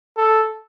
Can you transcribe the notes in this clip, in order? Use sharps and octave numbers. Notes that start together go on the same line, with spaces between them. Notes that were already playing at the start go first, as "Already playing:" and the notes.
A4